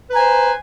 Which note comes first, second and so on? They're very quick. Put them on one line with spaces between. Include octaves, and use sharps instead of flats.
B4 A#5 G#5 C5